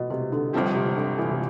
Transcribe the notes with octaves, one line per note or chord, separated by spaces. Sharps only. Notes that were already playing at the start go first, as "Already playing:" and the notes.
Already playing: B2 B3
C3
D3
G1 G2 F3 C4 G4
C3
D3
E3
C3